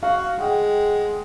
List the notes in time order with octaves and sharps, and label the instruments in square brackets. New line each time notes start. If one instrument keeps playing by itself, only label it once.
[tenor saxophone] F#4 [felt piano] F5
[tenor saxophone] G#3 [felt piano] F#5 G5